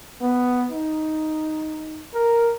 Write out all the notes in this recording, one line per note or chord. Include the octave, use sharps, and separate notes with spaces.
B3
D#4
A#4